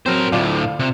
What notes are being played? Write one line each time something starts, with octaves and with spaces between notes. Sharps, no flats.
F#3 C4 A#4 C5
D2 A2 F4 D5
C3